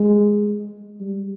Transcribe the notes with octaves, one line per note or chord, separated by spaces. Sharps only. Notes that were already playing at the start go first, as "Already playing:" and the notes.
Already playing: G#3
G3